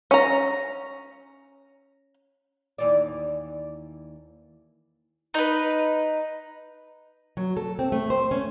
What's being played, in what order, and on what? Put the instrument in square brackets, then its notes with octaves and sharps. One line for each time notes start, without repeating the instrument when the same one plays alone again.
[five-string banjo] C#4 A#5
[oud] D#2 E3 D5
[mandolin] D#4 B4
[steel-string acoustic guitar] F#3
A4
C4
A3
C5
C#4